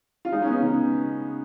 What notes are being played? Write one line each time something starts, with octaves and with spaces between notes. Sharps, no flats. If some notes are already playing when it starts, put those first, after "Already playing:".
F4
G#3 D#4
C#4
B3
D#4
C#3